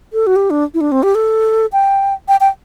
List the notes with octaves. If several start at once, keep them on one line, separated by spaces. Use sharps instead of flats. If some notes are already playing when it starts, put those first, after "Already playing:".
A4
F#4
G4
D4
E4
D4
C4
G4
A4
G5
G5
G5